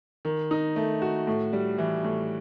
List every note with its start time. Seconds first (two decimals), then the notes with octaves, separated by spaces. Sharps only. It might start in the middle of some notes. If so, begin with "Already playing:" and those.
0.25 D#3
0.51 D#4
0.76 A3
1.02 F#4
1.27 A2
1.53 G3
1.78 E3
2.04 A2